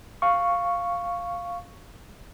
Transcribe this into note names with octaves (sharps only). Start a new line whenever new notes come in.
F5 C#6